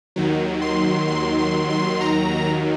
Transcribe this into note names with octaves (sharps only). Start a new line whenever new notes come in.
D#2 D#3 F#3
C6
C6
C6
C6
A#5